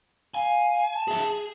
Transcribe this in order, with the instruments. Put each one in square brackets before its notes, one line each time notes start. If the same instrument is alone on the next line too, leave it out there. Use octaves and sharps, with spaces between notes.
[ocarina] F5 [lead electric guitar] G#5
[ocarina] A5
[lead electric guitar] G#4 E5
G#4